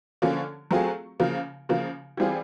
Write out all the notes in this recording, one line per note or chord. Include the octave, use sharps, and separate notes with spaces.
D3 F3 A#3 C#4
F#3 A3 C4 F4 G#4
C#3 F3 A#3
C#3 F3 A#3
E3 G3 C4 F4 G#4